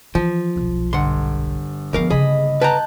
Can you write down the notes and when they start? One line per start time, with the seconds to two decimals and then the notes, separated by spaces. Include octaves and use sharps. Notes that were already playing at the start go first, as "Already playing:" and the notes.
0.15 E3 F3
0.56 D#1 B1
0.93 G1 F#5 C6
1.93 C#2 F3 B3 A#4 F5
2.10 C#3 A#3 G#4 D#5 B5
2.61 B4 G5 A5 A#5 F#6 G6